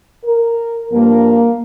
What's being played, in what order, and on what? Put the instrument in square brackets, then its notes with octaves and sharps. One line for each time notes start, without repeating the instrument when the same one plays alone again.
[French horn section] A#4
G2 F3 A#3